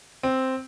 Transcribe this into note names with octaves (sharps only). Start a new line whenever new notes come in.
C4